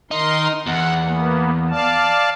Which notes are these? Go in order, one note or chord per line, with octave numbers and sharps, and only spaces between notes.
D#3 D#4 A#4 C6
E2 F#5
A#3 B3
D5 F5 A5